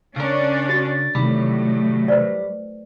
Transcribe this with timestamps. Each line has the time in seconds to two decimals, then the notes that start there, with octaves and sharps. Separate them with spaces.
0.16 C#3 C#4 D4 A#4
0.69 F#4 A6
1.15 A2 C3 D#3 E3 F#3 G3 B5
2.08 B4 C5 D5